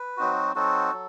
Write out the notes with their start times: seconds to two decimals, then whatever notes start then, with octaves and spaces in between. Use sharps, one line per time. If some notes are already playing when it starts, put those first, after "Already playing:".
Already playing: B4
0.17 F#3 C4 D#4 F#4
0.55 F#3 C4 D#4 F#4 A4
0.93 F#3